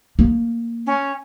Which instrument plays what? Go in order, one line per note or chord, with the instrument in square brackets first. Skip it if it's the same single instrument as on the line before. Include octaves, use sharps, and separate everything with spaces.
[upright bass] A#3
[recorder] C#4